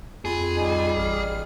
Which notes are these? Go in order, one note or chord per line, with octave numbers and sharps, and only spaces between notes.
F2 F4 G#4 B5
G3 D#4
A1 F6